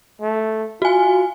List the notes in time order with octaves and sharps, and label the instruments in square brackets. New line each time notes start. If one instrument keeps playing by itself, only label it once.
[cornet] A3
[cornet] F4 [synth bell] F#4 G#5